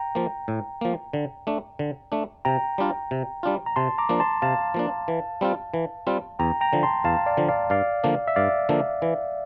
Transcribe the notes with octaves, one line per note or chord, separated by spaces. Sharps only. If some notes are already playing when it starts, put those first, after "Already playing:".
Already playing: G5 A#5
F3 A#3
A2
F3 A#3
D3
A3 D4
D3
A3 D4
C3 G5 A#5
G3 D4 F4
C3
G3 D4 F4
A#5
C3 A5 C6
A#5 D6
F3 A#3 D4
A5 C6
C3 F5 A5
F3 A#3 D4
E3
G3 C4 F4
E3
G3 C4 F4
E2 G5 A#5
G5 A#5
D3 F3
A5 C6
E2 F5 A5
D5 F5
D3 F3
D5 F5
G2 D5 F5
D3 F3 A#3 D4
E5
G2 D5 F5
D3 F3 A#3 D4
E3